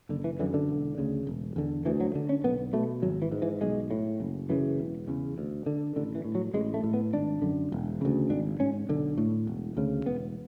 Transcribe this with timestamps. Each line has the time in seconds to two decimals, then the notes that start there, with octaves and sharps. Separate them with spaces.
0.09 F#1 D3
0.24 E3
0.39 F#2 D3 E3
0.54 D3
0.68 E1
0.98 D2 C#3
1.27 E1
1.56 E2 D3
1.86 D2 E3
2.00 F#3
2.15 D3
2.29 C#4
2.44 B1 B3
2.73 B2 A3
3.02 G#1 F#3
3.22 E3
3.32 G#2
3.42 E3
3.61 B1 G#3
3.91 A2
4.20 F#1
4.49 F#2 C#3 E3
4.78 E1
5.07 E2 C#3
5.38 D2
5.66 D3
5.96 A1 D3
6.15 E3
6.25 A2
6.35 F#3
6.54 A1 G#3
6.74 A3
6.84 A2
6.94 B3
7.13 G#1 D4
7.42 F#2 D3
7.72 E1
8.01 D2 C#3
8.30 G#1 D4
8.60 G#2 C#4
8.89 B1 D3
9.17 A2
9.47 E1
9.77 D2 C#3
10.06 E1 B3